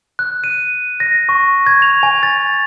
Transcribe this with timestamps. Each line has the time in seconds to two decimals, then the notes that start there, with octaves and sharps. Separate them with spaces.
0.19 F#6
0.44 D#7
1.00 A#6
1.29 C#6
1.67 G#6
1.82 F7
2.03 G#5
2.23 A6